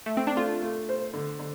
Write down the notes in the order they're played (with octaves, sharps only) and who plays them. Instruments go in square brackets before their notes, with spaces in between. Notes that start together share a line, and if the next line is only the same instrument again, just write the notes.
[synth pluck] A3
C4
D4
[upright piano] A3 [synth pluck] F4
[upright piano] A3
C5
D3
D3